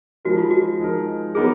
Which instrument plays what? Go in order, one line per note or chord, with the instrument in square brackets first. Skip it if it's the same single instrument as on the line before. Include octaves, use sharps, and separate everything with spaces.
[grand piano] F3 G#3 D#4 A#4 [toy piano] F#4
[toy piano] F4
F#4
[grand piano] F3 G#3 D#4 A#4
[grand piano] F#3 B3 D#4 A#4 [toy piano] G#4